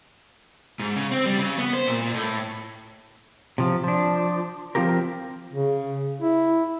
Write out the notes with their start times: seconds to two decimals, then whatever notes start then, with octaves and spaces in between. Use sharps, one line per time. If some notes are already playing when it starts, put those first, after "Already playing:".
0.80 G#2
0.96 C#3
1.11 C4
1.26 G3
1.38 C#3
1.58 B3
1.73 C5
1.87 A#2
2.02 A#2
2.14 A2
3.58 C3 F3
3.84 F3 D4
4.75 F3 C4 F4 G4 A#4
5.52 C#3
6.22 E4